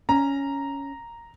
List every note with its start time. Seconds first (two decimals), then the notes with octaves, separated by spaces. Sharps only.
0.09 C#4 A#5